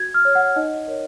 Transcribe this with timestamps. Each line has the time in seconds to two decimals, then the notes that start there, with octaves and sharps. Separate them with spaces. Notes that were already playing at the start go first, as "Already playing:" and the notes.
Already playing: F#4 G#6
0.14 F6
0.25 C#5
0.35 F#5
0.56 D#4 D#5
0.87 A#4 C#5